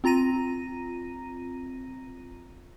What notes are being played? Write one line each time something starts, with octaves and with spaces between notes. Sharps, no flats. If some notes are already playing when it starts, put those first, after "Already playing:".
C4 F4 A#5 A#6 D#7